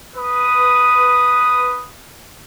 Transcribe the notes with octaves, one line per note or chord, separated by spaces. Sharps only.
B4 D#6